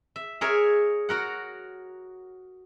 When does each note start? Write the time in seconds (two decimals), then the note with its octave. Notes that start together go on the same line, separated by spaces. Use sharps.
0.16 E5
0.41 G#4 A#4 C#5 E5
1.09 F#4 A#4 F#5